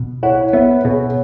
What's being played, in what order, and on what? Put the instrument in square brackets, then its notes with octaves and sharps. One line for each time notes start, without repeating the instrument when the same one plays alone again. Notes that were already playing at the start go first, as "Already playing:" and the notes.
Already playing: [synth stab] B2
[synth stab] E4 [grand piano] C#5 F#5
[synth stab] B3 [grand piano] B4 E5
[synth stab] B2 [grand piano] G#4 C#5